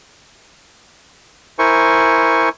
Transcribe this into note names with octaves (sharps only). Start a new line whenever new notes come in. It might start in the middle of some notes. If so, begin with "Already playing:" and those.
E4 A#4 C5 G#5 C#6